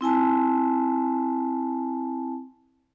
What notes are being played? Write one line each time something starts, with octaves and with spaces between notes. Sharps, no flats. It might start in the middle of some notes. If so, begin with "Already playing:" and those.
C4 E4 G#5 A5